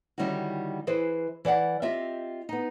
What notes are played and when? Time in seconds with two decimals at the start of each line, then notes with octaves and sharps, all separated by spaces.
0.18 D3 D#3 G3 C#4 E4 F#4
0.87 E3 G#4 B4 C5
1.45 E3 D5 E5 F#5
1.82 C4 F4 G4 D#5 E5
2.49 B3 D#4